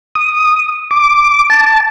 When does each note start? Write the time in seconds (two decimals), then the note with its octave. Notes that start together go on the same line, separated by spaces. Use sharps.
0.15 D#6
0.91 D6
1.50 A5